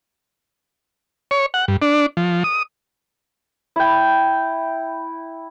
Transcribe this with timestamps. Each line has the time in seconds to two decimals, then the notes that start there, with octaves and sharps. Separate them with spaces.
1.31 C#5
1.54 F#5
1.68 G2
1.82 D4
2.17 F3
2.44 D#6
3.76 E4 G5